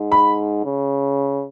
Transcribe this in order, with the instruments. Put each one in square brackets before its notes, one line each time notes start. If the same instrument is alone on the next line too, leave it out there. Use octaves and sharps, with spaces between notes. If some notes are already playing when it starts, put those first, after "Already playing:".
Already playing: [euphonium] G#2
[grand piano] B5
[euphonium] C#3